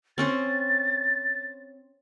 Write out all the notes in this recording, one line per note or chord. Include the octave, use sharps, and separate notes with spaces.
C4 C#4 C5 A6